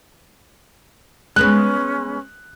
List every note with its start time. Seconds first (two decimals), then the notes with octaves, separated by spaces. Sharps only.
1.36 G#3 B3 C#4 B4 F#6